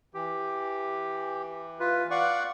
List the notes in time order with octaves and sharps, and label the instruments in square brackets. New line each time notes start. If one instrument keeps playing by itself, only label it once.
[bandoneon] E3 [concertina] G4
[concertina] F4 B4
[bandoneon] D5 F#5 C#6 [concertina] F5